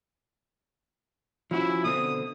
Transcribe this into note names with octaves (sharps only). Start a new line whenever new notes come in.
F3 C#4 E4 F#4
B2 D3 C4 D#6